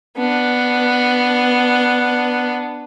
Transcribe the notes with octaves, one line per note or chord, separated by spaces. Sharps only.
B3 D4